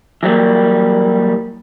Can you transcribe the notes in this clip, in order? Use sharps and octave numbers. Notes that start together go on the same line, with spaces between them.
E3 F#3 G3 A#3